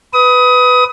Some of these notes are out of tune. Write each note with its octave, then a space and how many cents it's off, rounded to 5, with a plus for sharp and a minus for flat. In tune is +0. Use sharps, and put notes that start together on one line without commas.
B4 +10 D#6 +25